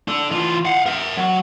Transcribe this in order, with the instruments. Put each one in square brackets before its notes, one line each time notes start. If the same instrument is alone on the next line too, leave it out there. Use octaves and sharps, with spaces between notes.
[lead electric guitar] D4 A4
E3 F4
F5 F#5
A#4 E5
F#3